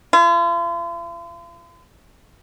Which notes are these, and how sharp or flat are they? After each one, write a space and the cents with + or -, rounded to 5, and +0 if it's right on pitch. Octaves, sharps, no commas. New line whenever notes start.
F4 -45